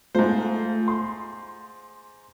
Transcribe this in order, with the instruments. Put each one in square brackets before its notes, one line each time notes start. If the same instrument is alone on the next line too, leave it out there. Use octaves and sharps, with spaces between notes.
[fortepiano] G#2 C5 [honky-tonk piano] A3 F4
[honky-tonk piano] C6